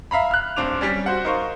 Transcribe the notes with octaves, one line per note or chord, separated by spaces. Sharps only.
E5 F5 A#5 B5
F6 F#6
D1 C4 D4 D6 F7
G3 C#4 D5
F#4 C5 F#5
D#4 A#4 C5 F5 C#6